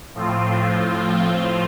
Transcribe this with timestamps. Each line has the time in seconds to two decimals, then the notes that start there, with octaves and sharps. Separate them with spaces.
0.15 A2 F3 C4 F4